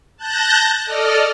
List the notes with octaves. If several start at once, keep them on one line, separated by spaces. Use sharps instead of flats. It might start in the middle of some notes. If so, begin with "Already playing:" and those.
A5 F#6 G6 A6 A#6
A4 D5 D#5 F6